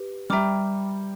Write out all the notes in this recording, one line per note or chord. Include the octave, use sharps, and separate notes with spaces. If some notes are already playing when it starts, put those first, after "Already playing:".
Already playing: G4 B4
G3 E5 G5 A#5 D6 F6